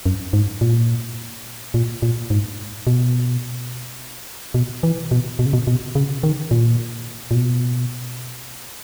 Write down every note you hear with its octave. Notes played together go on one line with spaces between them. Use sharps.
F#2
G#2
A#2
A#2
A#2
G#2
B2
B2
E3
B2
B2
C#3
B2
B2
C#3
D#3
A#2
A#2
B2